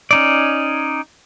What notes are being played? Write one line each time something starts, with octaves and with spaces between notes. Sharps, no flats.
C#4 D#4 D5